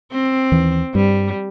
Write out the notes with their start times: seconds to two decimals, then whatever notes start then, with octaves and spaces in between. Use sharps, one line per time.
0.12 C4
0.52 D#2 E3
0.95 G2 G3